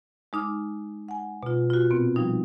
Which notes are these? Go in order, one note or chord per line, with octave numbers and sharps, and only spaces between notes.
G#3 D#4 D6 F6
F#5 G#5
B2 F4
F4 F#4
A#2 B3 C4
F3 G3 D#4